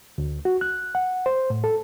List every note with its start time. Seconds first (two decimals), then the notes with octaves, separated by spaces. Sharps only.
0.18 D2
0.45 F#4
0.61 F#6
0.95 F#5
1.26 C5
1.50 A2
1.64 A4